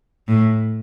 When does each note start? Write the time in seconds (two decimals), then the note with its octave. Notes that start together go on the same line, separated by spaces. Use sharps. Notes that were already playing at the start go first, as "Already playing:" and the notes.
0.28 A2